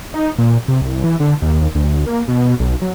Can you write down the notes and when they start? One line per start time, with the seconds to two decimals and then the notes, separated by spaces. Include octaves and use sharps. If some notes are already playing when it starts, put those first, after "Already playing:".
0.14 D#4
0.38 A#2
0.68 C3
0.82 C2
1.04 E3
1.20 D3
1.42 D#2
1.75 D2
2.07 A#3
2.28 B2
2.60 B1
2.82 F#3